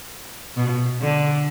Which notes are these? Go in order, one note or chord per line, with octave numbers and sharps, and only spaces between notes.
B2
D3